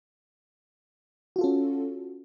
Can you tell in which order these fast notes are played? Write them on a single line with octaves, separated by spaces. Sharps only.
F#4 F4 A4 C#4